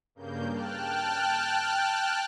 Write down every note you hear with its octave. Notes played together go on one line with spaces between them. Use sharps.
G2 C#3 A#3 G6
G5 A5 F6 F#6